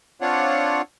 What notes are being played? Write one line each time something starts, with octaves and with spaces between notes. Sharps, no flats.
C4 D4 F4 C#5 F#5